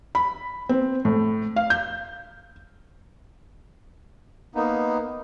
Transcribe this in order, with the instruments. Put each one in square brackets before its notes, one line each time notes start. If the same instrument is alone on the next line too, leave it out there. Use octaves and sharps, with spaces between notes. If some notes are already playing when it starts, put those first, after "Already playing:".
[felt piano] B5
C4
A2
F5
G6
[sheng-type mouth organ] A#3 B3 D#4